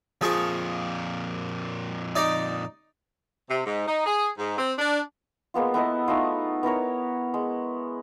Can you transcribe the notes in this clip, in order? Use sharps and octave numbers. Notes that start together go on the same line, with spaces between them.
F2 A#2 F3 G#4 C#6
D#4 D5 D6
C3
G#2
D#4
G#4
G#2
C4
D4
G#3 A#3 B3 F4
B3 E4 A4 D#5
A3 D#4 F4
B3 E4 A#4 C#5
G#3